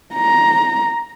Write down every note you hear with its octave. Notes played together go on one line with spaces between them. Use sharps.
A#5